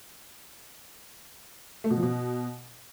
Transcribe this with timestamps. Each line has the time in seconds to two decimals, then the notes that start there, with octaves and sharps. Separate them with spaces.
1.84 A3
1.90 B2
1.96 F3
2.03 B2